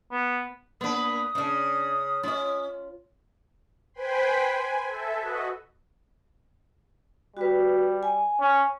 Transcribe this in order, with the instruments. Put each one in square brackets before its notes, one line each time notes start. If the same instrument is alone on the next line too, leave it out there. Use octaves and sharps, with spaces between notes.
[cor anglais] B3
[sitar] A#3 B4 [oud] B3 D4 [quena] D#6
[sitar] C#3 [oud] C#4 D4
[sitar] C#4 [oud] F4 D#5
[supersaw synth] B4 C5 G5 G#5 B5 C6
G#5
A4 E5
F#4 B4 D#5
[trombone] G3 [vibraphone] F#4 B4
[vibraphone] G#5
[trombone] C#4